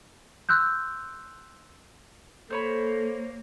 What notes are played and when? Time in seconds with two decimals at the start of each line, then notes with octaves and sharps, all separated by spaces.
0.49 C6 E6 F#6 G6
2.50 A#3 A4 C5 C#5 B5